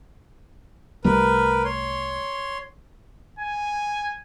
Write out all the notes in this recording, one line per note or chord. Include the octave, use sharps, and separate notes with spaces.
C2 G3 A3 A#4 B4
C#5 C6
G#5